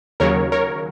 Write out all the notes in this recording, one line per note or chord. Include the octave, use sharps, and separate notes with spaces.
D#2 C#3 F#3 A#4 C#5
A#4 C#5